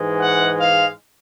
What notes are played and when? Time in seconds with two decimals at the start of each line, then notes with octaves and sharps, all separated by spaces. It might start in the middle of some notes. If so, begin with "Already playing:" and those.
Already playing: G#2 E3 G#3
0.20 F#5
0.59 F5